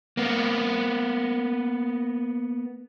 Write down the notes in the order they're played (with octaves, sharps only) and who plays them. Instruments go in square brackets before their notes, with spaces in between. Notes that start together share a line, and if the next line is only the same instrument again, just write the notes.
[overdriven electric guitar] A#3 B3